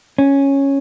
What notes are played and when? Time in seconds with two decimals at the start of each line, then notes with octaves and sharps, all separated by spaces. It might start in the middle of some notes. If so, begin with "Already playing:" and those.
0.18 C#4